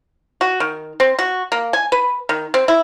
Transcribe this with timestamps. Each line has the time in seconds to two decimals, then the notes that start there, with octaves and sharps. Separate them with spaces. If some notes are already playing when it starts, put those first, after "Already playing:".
0.41 F#4
0.60 D#3
1.00 C4
1.19 F#4
1.52 A#3
1.73 G#5
1.92 B4
2.29 D#3
2.54 C4
2.68 E4